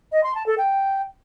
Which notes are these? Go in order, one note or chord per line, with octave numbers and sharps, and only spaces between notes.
D#5
C6
A5
A4
G5